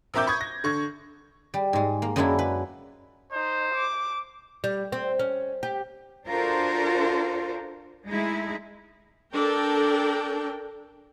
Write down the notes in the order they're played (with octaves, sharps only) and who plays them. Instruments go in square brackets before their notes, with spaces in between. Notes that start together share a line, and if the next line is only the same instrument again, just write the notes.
[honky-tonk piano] A#1 C4 A#4 E5 D6 G6
B5 C#6 D#6 G#6
A#6
D3 C#6 G#6
[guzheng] G3
G#2 G#3
A#3
F#2 F#3 G#3 A#3 D4 E4
B4
[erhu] D#4 [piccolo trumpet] C5
[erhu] D6
[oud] G3
C4
C#4
G4
[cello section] D4 F4 F#4 A4 A#4 C5
G#3 A3 D#4 E4 G#4
[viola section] D4 A4 A#4 G5